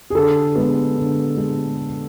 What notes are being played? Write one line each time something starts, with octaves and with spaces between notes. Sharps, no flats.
G#4
D3 A4
G#3 B3
D3
G#3